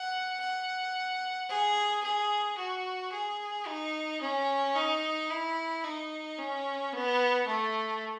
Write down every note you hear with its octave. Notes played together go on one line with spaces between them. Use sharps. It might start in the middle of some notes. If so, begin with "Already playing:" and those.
Already playing: F#5
F#5
G#4
G#4
F#4
G#4
D#4
C#4
D#4
E4
D#4
C#4
B3
A3